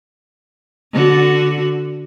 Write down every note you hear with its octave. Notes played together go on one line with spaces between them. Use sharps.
D3 F#4